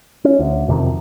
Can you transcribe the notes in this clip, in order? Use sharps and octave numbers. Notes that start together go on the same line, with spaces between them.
C#4
D2
F#1 F2 C3 D#3